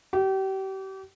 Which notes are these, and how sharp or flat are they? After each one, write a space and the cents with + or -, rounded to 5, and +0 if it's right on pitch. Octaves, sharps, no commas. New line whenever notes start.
G4 -35